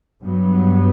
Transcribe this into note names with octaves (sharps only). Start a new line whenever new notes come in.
G2 F#3 B3